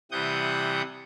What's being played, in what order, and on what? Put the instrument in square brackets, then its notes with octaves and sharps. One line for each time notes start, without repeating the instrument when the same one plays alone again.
[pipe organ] C3 E3 G3 F#5 D#6 G6